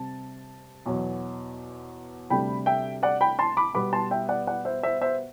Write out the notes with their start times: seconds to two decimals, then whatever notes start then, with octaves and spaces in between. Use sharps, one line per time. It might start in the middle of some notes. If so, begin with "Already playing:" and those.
Already playing: C3 G3 C4 A5
0.86 E2 B2 F#3
2.30 D2 C3 G3 D4 G5 B5
2.66 E5 G5
3.03 D5 F#5
3.21 G5 B5
3.39 A5 C6
3.57 B5 D6
3.75 B2 G3 B3 B5 D6
3.93 A5 C6
4.11 E5 G5
4.29 D5 F#5
4.47 D5 F#5
4.65 C5 E5
4.83 C5 E5
5.01 C5 E5